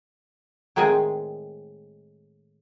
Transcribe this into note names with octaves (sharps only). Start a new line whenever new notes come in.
A2 D#3 G#3 C4 D#5 G#5